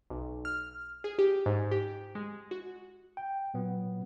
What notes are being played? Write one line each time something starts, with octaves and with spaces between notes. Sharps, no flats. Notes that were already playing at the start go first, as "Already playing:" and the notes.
B1
F6
G#4
G4
G#2
G4
G#3
F#4
G5
A#2 F#3 B3